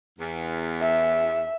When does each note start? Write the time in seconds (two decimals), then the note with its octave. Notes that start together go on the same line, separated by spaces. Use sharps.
0.19 E2
0.81 E5